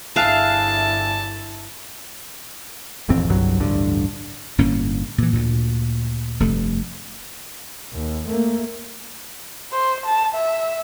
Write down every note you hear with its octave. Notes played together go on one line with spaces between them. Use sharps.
G1 D4 E4 G#4 E5 F5 A5
E1 A1 F2 C4
G1 C2 G2 F#3
A1 D2 G2 D3
G1 A2 A#3 C#4
A#2 E3
D2 A#2
F1 G2 A3
D#2
A3 A#3
C5
A5
E5